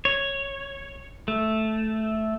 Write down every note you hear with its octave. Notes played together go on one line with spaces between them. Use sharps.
C#5
A3